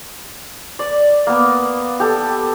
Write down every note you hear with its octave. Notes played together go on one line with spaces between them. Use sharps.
D5
A#3 B3
G4 A4